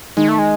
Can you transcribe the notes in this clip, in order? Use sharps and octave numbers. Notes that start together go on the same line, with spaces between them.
D#3 G#3
A3
G#3